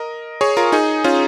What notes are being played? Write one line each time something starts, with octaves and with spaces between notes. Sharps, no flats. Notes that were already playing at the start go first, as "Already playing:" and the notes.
Already playing: A#4 D#5
G#4 C#5
F4 A#4
D#4 G#4
C#4 F4